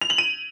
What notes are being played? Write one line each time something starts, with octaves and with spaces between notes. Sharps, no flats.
F7
F#7
D#7